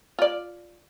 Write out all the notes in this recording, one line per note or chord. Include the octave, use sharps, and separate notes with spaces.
F4 D5